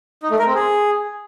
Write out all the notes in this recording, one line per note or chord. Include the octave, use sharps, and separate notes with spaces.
D#4
A3
A#4
C4
G#4